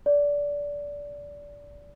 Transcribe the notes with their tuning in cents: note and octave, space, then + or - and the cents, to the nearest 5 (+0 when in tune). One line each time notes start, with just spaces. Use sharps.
D5 -20